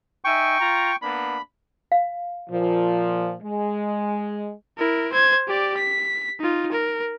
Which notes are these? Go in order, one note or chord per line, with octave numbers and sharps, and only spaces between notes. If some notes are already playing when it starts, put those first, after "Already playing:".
D#4 E5 G5 G#5 C#6
F4 A#5
A#3 B3 D4 B5
F5
A#2 F3
G#3
E4 A#4
C5 G#6
G4 D5
B6
D#4 F4
A#4